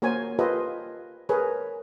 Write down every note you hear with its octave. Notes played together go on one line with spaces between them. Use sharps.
A#3 F#4 A#4 C5 C#5 G#5
F4 G4 A4 B4 C5 D#5
G#4 A#4 B4 C#5